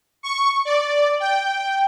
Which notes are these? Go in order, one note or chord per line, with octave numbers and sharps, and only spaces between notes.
C#6
D5
G5